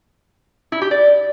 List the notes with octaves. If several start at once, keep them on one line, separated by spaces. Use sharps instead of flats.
E4
G4
D5